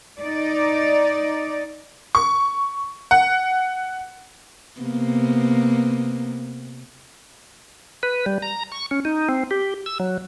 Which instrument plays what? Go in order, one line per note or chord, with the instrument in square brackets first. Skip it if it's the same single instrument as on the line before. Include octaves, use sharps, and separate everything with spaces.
[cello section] D#4 D5
[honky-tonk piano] C#6
F#5
[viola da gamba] C3 A#3 B3
[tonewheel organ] B4
G3
A#5
C#6
C#4
D#4
C4
G4
E6
F#3